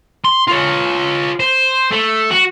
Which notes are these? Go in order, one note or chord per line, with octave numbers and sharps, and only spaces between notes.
C6
F4 C#5
C5
A3
F#4